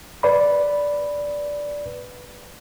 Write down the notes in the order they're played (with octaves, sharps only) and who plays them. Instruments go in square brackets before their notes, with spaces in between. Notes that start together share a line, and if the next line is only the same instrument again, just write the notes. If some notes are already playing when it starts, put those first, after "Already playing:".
[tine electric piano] B4 D5 B5